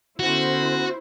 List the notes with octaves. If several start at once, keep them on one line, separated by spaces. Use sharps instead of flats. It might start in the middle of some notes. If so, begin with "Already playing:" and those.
D3 B3 C#4 E4 F#4 C5